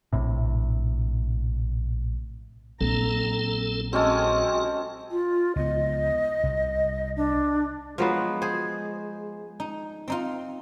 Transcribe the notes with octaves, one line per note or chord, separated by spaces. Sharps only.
A#1 A2 C3
A#1 F#3 C4 A4 A#5
G#3 C4 C#4 F#4 A4
F4
C#2 B3 D#5
C2
D4
F3 F#3 G#3 B3 F5
G#4 C5
D#4
C4 D#4 F4